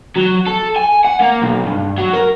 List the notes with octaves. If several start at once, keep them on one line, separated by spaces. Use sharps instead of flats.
F#3
A4
G#5
F#5
A#3
B1
G2
F#3
A#4